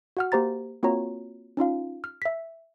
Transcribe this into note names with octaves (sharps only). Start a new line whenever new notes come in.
F#4 F#5 F6
A#3 G4 C5 A#5 A6
A#3 C4 F4 F#4 C#5 A#5
C#4 D#4 F4 F5
F6
E5 B6